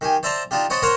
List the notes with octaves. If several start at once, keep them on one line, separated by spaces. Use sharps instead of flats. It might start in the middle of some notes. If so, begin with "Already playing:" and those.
D#3 G4 G#5
C5 D5 E5 A5 A#5 C6
D4 D#4 F4 G4
C5 C#5 D#5 F#5 A5 B5
A#4 C5 C#5 F#5 A#5 C6